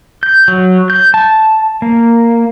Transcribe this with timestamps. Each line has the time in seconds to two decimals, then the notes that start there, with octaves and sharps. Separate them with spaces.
0.23 G6
0.48 F#3
0.90 G6
1.14 A5
1.82 A#3